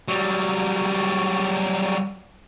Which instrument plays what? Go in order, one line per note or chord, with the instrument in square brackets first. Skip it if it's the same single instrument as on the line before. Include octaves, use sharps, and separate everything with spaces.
[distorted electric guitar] F#3 G3